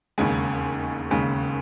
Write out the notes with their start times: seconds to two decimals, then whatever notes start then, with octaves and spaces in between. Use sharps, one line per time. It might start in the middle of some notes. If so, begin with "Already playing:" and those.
0.18 E1 D#2 C#3 G#3 G#5
1.10 E1 D#2 C#3 G#3